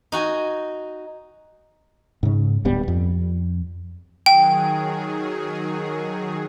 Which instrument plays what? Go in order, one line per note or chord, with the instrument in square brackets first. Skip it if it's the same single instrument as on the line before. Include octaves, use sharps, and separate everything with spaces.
[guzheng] D#4 F#4 G#5
[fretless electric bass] G#2 C#3
D1 G2 G3 B3
F2
[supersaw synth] D#3 F#3 G#4 [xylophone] G5